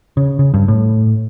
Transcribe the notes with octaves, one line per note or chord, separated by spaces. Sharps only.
C#3
C#3
G2
A2